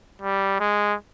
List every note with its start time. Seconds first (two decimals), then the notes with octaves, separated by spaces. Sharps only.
0.22 G3
0.60 G#3